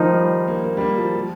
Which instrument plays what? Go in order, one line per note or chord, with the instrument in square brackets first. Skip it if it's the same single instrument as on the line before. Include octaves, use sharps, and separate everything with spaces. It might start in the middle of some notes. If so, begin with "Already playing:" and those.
Already playing: [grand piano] D#3 [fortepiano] F3 D#4
[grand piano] G3
A#3
A#3
G3
A#3
F3
F3